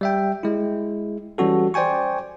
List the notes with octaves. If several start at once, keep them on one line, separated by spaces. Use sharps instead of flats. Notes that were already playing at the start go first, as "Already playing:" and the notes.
G3 E5 G5
G#3 E4
E3 G3 C#4 F#4 A4
C5 D5 G5 G#5 C#6